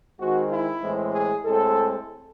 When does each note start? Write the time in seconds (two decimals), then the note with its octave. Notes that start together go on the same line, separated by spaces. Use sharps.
0.19 D#3 G#3 C4 F#4
0.50 E4
0.82 A2 E3 G#3 C4
1.12 G#4
1.44 A2 G#3 C4 A4